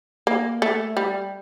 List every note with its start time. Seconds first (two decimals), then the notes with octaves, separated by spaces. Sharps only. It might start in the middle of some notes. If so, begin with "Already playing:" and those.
0.27 A#3
0.62 A3
0.97 G3